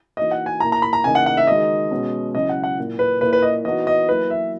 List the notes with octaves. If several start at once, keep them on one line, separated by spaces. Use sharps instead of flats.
E3 A#3 D#4 F#4 D#5
F#5
G#5
A#2 A#3 E4 A#5
A#5
B5
A#5
C#3 E3 A#3 D#4 G#5
F#5
F#5
E5
D#3 G#3 D#4 F#4 D#5
B2 G#3 C#4 F#4
C#3 F#3 C#4 E4 D#5
F#5
F#5
A#2 A#3 E4
B4
A#2 A#3 E4 B4
B4
D#5
E3 B3 D#4 F#4 D#5
D#5
F#3 A#3 E4 B4
E5